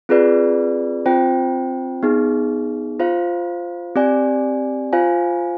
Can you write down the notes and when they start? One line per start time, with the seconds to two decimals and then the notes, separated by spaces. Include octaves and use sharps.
0.09 C4 F4 G#4 B4 D5
1.06 C4 F4 C5 G5
2.03 B3 D#4 G#4
3.00 F4 C5 F5
3.96 C4 G4 D5 G#5
4.93 F4 C5 F5 G#5